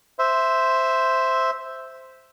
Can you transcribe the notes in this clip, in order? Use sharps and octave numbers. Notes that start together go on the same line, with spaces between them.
C5 E5